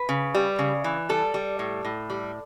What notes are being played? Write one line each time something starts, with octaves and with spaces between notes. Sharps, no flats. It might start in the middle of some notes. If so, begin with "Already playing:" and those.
Already playing: B4
C#3
G3
C#3
E3
G3 A4
G3
A2
A2
G3